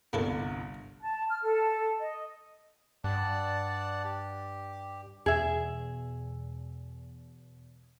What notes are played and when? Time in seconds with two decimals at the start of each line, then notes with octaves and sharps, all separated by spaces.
0.13 G1 C2 G2 A#3 E4 A4
1.01 A5
1.28 F6
1.43 A4
2.00 D#5
3.04 G2 D5 F#5 A5
4.04 G4
5.26 E2 B2 G#4 E5